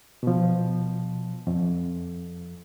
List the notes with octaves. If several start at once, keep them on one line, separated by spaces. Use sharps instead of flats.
B2 F3
F2